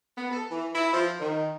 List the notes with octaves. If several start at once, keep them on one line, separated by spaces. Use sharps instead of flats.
B3
A4
E3
E4
F3
D#3